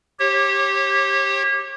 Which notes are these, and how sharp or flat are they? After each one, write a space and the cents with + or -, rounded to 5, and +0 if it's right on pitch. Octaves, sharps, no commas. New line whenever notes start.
G4 +0 C#5 -35